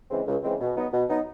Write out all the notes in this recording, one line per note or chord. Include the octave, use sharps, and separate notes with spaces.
C#3 E3 G#3 C4
C#2
C#3 E3 G#3 C4
B2
F#3 B3 D#4
B2
F#3 B3 D#4